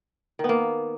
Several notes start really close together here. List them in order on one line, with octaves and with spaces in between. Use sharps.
D#3 B3 A#3